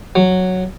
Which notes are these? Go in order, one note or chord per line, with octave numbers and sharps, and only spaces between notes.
F#3